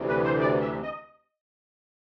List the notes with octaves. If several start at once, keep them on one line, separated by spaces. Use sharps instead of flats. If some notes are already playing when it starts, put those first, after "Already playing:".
Already playing: D2 C3 E3
B4
C5
D5
E5
D#5